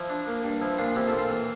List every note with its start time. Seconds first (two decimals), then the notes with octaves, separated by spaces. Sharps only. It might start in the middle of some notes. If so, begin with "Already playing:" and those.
Already playing: F3 E4
0.10 D4
0.27 A#3
0.44 G2
0.61 F3 E4
0.78 A#2 D4 F4
0.96 C4 E4 G4
1.07 F4 A4
1.13 A#2
1.19 F4 A4
1.31 E3